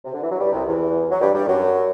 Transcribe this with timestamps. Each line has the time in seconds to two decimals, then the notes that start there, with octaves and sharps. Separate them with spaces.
0.05 C3
0.13 D3
0.23 E3
0.30 F#3
0.39 G2 G3
0.52 C2 C3
0.66 E2 E3
1.11 F#3
1.20 G2 G3
1.34 G2 G3
1.47 F#2 F#3